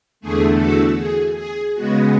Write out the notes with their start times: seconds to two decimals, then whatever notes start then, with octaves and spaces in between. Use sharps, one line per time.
0.21 E2 D3 A3 G#4
0.58 F#4 A4
0.97 G#4
1.36 G#4
1.74 C#3 G#3 B3 F#4